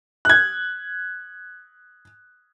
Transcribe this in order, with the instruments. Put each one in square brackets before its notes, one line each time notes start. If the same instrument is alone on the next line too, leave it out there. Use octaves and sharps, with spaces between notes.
[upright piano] F#6 G#6